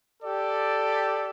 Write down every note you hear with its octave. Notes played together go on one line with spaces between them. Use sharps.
G4 A4 D5